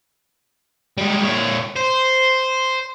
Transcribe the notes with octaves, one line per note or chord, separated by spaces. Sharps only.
G3 G#3
A#2 C#5
C5